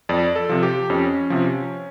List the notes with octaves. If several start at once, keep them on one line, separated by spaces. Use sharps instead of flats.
F2 D5
A4
C3 F3
G4
F2 C#4
C3 F3